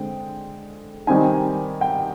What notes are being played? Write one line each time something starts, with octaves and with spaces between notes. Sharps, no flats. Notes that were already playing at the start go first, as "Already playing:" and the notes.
Already playing: D3 G#3 C4 G5
D#3 G3 C4 D#4 G#5
G5